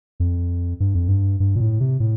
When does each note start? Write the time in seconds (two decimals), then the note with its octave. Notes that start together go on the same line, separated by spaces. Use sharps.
0.20 F2
0.80 G2
0.94 F2
1.08 G2
1.40 G2
1.56 A#2
1.60 A2
1.80 C3
2.00 A2